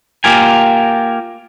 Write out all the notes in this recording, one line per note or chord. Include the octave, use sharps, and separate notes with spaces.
A#3 F4 G4 A#4 G#5